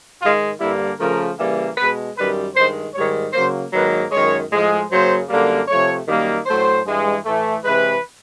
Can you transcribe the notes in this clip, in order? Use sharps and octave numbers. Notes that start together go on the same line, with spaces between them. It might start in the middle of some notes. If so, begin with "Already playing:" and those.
G#2 D#3 G#3 F4
G2 D3 G3 A#3 E4
C#3 F3 A3 A#4
C#3 E3 G3 A#3
B2 G#3 B4
F#2 D#3 G3 B4
G2 D#3 G#3 C5
G#2 D#3 G3 C#5
C#3 F#3 A#3 C5
G#2 D#3 F#3 A#3 B4
F#2 D#3 G#3 C#5
A2 F3 G#3
F#2 C#3 F#3 A#3 C5
F#2 D3 G3 A#3
C3 F3 A3 C#5
F#2 D#3 G3 A#3
A2 F#3 A3 C5
G2 E3 G#3
A2 E3 A3
C3 E3 G#3 B4